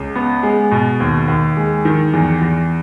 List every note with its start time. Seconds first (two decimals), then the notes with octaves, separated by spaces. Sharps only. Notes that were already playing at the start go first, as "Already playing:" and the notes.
Already playing: C#2
0.15 B3
0.43 G#3
0.71 B2
1.00 D#2
1.28 D#2
1.57 G#3
1.85 D#3
2.13 E2
2.41 E2